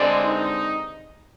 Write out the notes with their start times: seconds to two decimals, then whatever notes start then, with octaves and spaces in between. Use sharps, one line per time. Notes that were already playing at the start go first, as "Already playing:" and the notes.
Already playing: G2 D3 G#3 C4 D4 D5
0.22 D#4 D#5